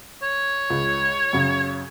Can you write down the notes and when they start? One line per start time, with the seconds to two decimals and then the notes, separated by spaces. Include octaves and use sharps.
0.22 C#5
0.70 C#2
1.33 F#2 C#3